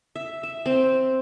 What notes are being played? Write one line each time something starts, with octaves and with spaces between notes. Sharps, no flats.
E5
E5
C4